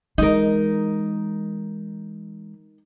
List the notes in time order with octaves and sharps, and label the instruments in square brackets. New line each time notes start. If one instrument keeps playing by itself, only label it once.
[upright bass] E3 G#3 [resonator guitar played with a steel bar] D#4 A#4